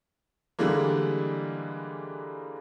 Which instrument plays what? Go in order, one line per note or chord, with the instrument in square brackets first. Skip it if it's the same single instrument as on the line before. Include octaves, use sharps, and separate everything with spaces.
[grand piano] D3 E3 G3 G#3 A#3